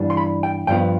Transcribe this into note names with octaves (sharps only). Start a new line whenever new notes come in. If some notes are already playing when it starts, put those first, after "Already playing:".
Already playing: G2 E3 G3 B3 D4
C6
B5
G5
G2 F3 B3 G5